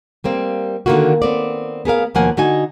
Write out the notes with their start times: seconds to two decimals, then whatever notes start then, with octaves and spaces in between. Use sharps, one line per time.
0.24 G3 A#3 C4
0.86 D3 D#3 G#3 A#3 F4 F#4
1.22 B3 C4 D5
1.85 B3 G#4 A#4 F5
2.15 D#2 B2 F3 A#3 F#5 G#5
2.37 D3 D#4 F#4 D#5 G#5